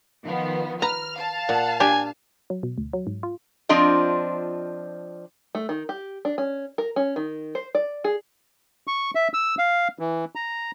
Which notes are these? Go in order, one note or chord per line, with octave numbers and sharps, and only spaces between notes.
D#3 F3 B3
B4 A#5 F6
F5 A5
A#2 F#5
D4 G4 G#5
F#3
B2
D2
F#3
G#2
F4
F3 C4 D4 F4 D#5
A3
D#3
G4
D4
C#4
A#4
C#4
D#3
C5
D5
G#4
C#6
E5
E6
F5
E3
A#5